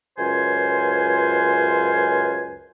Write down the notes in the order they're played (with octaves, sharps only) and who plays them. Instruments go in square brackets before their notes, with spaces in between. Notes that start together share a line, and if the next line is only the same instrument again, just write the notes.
[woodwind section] C#2 F#2 F4 B4 C5 G#5